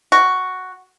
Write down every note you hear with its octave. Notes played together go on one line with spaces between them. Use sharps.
F#4